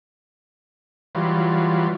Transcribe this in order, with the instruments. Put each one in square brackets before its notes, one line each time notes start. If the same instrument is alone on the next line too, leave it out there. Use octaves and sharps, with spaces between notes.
[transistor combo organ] E3 F#3 G3 F4